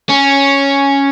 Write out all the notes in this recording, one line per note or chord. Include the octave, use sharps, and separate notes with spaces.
C#4